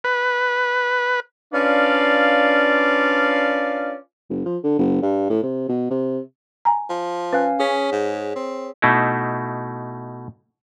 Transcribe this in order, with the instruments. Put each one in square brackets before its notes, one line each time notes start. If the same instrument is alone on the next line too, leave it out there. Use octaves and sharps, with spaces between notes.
[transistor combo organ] B4
[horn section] C#4 D4 F4 B4 D5 F5
[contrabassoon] F#1
F3
D3
F#1
G2
A2
C3
B2
C3
[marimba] G#5 A#5
[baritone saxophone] F3
[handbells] C#4 F5 G#5 [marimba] B4 F#6
[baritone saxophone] C#4 [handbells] G#4 C#5 B6
[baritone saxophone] G#2
C4
[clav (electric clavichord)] B2 A3 D#4 E4